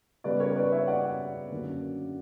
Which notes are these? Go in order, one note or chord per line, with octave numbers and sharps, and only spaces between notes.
C#3 G3 B3 B4 D5
A#4 C#5
B4 D5
C#5 E5
D5 F#5
F#2 D3 A#3 C#4